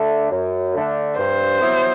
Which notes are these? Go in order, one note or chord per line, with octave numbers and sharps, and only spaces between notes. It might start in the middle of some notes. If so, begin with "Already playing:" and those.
Already playing: D3 A3 D4
F#2
D3 A3 D4
G2 C5
F#3 B3 E4